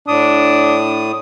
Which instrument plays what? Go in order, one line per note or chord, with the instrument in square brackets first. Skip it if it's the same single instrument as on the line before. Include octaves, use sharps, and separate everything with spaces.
[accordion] A2 D#6 [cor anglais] D4